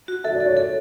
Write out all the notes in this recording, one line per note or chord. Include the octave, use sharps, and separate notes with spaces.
F#4
A4 E5
D5
A4
C#5
A4